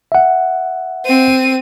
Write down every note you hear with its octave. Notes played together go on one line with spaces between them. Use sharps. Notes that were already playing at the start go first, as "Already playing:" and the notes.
E5 F#5
C4 D#7